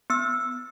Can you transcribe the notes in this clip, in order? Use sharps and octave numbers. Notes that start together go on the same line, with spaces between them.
B3 E6